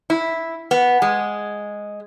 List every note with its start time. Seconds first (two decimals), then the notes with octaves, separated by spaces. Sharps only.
0.10 E4
0.71 B3
1.02 G#3